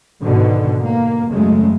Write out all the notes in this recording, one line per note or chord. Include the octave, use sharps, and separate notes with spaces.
G#2 B2 D3 D#3
A#3
F#2 C#3 F#3 G#3 A3